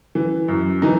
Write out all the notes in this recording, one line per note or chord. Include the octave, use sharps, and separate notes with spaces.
E3
F#2
E3 D#4